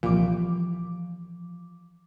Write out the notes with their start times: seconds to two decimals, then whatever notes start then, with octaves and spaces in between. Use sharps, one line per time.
0.03 C2 A#2 E3 F3 D6